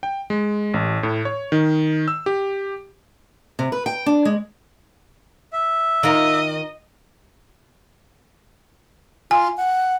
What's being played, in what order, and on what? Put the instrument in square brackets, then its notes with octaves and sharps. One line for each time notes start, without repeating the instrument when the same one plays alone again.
[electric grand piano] G5
G#3
A1
A2
C#5
D#3
E6
G4
[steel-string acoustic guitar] C3
B4
G5
D4
G#3
[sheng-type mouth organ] E5
[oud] D#3 F4 A#4 [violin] D#5
[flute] F4 [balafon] G#5
[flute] F#5